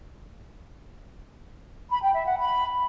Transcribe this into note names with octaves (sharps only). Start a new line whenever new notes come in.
B5
G5
E5
F#5
B5